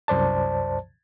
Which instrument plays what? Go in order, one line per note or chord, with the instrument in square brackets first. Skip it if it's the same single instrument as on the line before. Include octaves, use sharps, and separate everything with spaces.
[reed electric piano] C2 F#2 C5 D5 A5